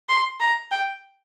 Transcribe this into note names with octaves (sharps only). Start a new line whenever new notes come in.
C6
A#5
G5